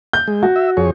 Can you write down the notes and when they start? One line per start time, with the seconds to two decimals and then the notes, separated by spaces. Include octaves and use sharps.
0.13 G6
0.28 G#3
0.43 F#4
0.56 E5
0.77 F2 G#4 C#5